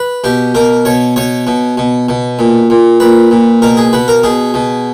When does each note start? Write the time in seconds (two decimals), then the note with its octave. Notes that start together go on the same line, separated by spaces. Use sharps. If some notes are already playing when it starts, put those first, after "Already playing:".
Already playing: B4
0.24 B2 G4
0.55 B2 A#4
0.85 B2 C#5
1.16 B2 C#5
1.47 B2
1.78 B2
2.09 B2
2.39 A#2
2.70 A#2
3.00 A#2 B4
3.31 A#2
3.62 B2 A#4
3.77 G#4
3.93 B2 B4
4.08 A#4
4.23 B2 G#4
4.54 B2